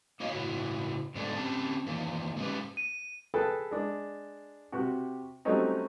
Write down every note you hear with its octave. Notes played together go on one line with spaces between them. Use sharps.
A#3 F#4 C#5 D#5 F5
A2 C#3 E4 F#4
G#2 C3 G#3 B3 D4 A4
C4 C#4 G4 A5
D#3 E3 A#3 F4
G#3 C#4 G4 B4
D#7
G#4 A4 B4 G5 A5 B5
G#3 D4
C3 F#4 G4
F#3 G3 A3 C4 C#4 D#4